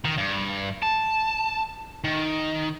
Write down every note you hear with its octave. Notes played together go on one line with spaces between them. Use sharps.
D#3
G2
A5
D#3